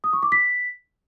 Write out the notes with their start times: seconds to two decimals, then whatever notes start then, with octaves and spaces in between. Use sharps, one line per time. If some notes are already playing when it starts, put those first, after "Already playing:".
0.04 D#6
0.13 C#6
0.23 D6
0.32 B6